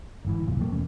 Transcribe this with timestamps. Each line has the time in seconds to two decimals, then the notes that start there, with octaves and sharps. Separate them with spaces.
0.25 G1 G#2 E3
0.47 C2 F#2 A#2
0.59 F3 G3 A3 A#3
0.72 E2 B2 C#4